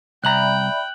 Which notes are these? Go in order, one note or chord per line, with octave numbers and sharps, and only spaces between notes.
C2 D5 E5 G5 A#5 B5 F#6 F#7